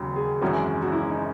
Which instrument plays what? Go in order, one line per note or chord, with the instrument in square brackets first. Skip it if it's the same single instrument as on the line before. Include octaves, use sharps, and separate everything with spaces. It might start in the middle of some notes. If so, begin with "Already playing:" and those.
Already playing: [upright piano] E1 D#2 C#3 F#3
[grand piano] G#4
[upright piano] G#1 F#2 E3 G#3 C#4 [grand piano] F#4
[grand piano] F#4
E4
D#4